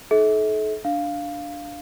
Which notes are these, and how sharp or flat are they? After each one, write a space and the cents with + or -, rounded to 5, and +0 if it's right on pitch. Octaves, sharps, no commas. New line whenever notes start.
D#4 +0 A4 -40 E5 -40
D4 +0 F5 +0